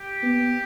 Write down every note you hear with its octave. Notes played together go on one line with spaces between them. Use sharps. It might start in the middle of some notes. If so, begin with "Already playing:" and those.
Already playing: G4
B3